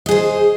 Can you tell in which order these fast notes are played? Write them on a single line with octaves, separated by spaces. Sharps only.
D#5 G#4 C5